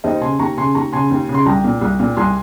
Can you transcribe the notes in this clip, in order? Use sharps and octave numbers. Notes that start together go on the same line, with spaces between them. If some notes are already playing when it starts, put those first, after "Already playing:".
D#2 C5 D#5
C#3 G#5 C6
D#2 A#5 C#6
C#3 G#5 C6
D#2 A#5 C#6
C#3 G#5 C6
D#2
C#3
C6
C2 G5 A#5
A#2
C2
A#2
C2 G#5 C6